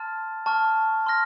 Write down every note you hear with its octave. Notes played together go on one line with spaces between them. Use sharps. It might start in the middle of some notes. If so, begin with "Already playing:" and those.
Already playing: A5 C6 F6 A6
A5 C#6 F6
C6 F6 A#6